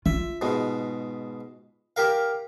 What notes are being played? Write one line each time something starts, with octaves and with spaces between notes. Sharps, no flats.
F4 E5
G#2 B2 G#3
G4 A#4 F5